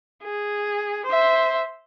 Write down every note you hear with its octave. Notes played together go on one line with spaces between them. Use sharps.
G#4
C5 E5